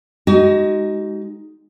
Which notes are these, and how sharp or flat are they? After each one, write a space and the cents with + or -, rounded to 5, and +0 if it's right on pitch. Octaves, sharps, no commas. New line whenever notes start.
G#3 +0 D#4 +5 F#4 +40